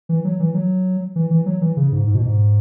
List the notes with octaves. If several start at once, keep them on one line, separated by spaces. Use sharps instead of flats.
E3
F#3
E3
F#3
E3
E3
F#3
E3
C#3
G#2
G#2
B2
G#2